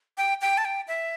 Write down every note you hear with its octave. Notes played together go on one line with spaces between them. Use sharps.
G5
G5
A5
G5
E5